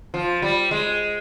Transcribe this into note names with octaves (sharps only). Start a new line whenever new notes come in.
F3
G3
G#3